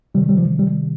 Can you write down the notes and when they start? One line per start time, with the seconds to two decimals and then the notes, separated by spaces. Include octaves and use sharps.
0.15 C3 D#3 G3
0.29 G3
0.37 F3
0.59 G3